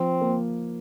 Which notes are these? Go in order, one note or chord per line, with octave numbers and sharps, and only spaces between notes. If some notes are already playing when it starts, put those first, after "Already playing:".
Already playing: F3 C4
A#3